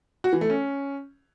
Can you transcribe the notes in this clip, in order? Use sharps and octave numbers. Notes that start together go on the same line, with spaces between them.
F#4
E3
A3
C#4